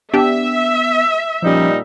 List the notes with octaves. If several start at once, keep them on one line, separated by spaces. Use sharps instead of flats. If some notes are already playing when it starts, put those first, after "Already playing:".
B3 D4 G4 E5
A#2 F3 G3 C#4 D#4